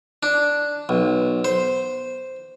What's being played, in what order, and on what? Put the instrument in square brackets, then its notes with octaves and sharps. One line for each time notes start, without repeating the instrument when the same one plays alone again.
[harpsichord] D4
B1
C5